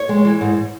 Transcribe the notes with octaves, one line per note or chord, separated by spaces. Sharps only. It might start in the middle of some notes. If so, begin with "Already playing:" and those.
Already playing: C#5
G#3
E3
G#2